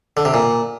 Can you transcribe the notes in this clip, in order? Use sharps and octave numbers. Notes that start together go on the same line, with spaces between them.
D3
C3
A#2